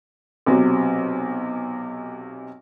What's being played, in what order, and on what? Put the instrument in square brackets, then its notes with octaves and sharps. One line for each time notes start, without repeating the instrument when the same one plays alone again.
[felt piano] B1 C3 F#3